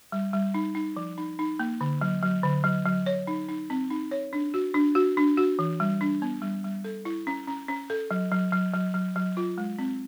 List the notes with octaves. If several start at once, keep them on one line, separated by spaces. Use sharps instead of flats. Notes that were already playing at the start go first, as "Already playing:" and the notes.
G3
G3
D#4
D#4
F3
D#4
D#4
A#3
D3
F#3
F#3
D3
F#3
F#3
C#5
D#4
D#4
C4
D#4
C#5
D4
F#4
D4
F#4
D4
F#4
E3
G3
D4
B3
G3
G3
A4
E4
C#4
C#4
C#4
A4
F#3
F#3
F#3
F#3
F#3
F#3
F4
G#3
C4